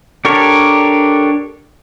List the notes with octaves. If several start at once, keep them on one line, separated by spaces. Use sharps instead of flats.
D4 G4 A4 A#4 C#5